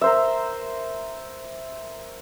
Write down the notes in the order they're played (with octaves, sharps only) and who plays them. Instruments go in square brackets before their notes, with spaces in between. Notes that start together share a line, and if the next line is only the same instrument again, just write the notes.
[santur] A#4 C5 E5